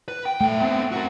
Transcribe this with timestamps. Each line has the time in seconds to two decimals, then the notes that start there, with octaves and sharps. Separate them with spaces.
0.08 B4
0.26 G5
0.41 A#2 A3 G5
0.60 B3 C4
0.92 F#4 A#4